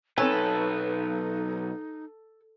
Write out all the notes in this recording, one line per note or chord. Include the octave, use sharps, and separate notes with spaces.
B1 C4 D#4 A4 B4 C#5 G#5